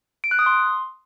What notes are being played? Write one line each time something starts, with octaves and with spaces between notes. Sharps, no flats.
D7
F#6
D#6
C6